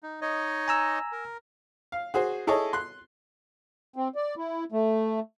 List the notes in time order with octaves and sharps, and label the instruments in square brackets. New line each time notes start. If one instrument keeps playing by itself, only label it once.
[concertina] D#4
D#4 C#5 D#5
[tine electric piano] G#5 A#5 E6
[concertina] A#4
[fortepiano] F5
F#4 G#4 C5
E4 G#4 A4 C#5 D#5
C6 F#6
[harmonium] C4
D5
E4
A3